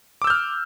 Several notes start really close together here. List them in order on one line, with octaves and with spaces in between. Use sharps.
D6 E6 G6 F6